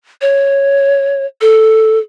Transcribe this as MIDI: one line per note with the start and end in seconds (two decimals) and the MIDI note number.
0.21 1.26 73
1.41 1.98 69